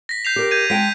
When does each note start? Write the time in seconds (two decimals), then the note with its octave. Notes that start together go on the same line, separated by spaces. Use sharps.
0.09 A#6 B6
0.25 G6 C7 F7
0.36 G4 A#4
0.51 G6 G#6 D#7
0.70 G#3 G5 A5 B6